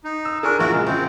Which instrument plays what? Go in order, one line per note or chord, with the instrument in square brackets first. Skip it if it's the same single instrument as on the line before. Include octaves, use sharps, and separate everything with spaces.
[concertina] D#4
[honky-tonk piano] E6
[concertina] D4 A#4 [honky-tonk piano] G#4 G#5 C#6
[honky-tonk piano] A#1 E3 [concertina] F#4 A#4
[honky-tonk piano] C#3 [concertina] G#3
[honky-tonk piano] A#1 [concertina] C4